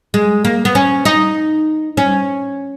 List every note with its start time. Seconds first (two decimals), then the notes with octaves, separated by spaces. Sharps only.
0.14 G#3
0.45 A#3
0.65 B3
0.75 C#4
1.05 D#4
1.97 C#4